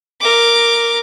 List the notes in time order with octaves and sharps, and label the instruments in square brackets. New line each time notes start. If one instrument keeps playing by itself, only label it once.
[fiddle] A#4 D6